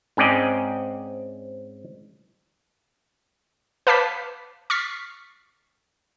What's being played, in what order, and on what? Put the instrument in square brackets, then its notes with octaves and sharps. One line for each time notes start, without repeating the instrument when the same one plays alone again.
[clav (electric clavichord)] G#2 C4 C#4 D5 D#5
[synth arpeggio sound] B4 F5 A5 D6 G6 B6
C#6 F6 A6 B6 C7